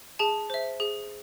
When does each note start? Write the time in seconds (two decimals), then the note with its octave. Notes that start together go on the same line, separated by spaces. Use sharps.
0.19 G#4 A5
0.50 C5 E5
0.80 G#4